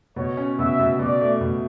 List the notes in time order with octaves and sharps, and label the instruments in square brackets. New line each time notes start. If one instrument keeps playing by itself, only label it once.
[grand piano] B2 [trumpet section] C#5
[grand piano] C#4
[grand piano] B2 [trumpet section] E5
[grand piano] B2
[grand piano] B2 [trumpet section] D5
[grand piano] A3
B2